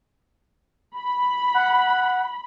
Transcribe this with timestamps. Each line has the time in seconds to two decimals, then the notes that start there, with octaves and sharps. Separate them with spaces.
0.97 B5
1.54 F#5